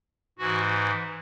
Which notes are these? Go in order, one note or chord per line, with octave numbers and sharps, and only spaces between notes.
G#2 E3 F#4